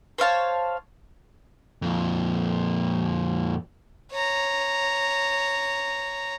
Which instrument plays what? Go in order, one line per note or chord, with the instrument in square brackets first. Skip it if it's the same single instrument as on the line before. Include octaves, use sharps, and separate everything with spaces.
[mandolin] C5 C#5 F5 A5
[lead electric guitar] F2 A#2
[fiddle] C#5 A#5